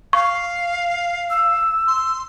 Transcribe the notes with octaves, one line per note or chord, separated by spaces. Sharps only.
F5 C#6
E6
C6